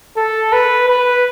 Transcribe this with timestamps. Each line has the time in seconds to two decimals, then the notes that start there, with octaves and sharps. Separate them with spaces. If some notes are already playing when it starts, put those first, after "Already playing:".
0.17 A4
0.53 B4
0.88 B4